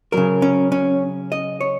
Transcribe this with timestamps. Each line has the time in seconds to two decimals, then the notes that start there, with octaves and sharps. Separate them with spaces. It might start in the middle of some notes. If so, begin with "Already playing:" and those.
0.12 C#3 F#3 A#4
0.42 C#4
0.72 C#4
1.32 D#5
1.61 C#5